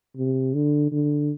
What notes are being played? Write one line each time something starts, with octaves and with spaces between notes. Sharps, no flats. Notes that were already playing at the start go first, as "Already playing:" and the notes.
C3
D3
D3